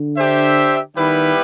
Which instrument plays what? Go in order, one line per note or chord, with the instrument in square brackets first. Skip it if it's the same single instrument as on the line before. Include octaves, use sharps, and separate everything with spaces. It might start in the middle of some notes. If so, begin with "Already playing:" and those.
Already playing: [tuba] D3
[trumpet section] D4 G4 C5 E5
[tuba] D#3 [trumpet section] G3 B3 E4 G4 B4